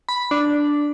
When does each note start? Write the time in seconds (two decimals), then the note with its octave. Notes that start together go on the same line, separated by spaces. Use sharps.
0.09 B5
0.31 D4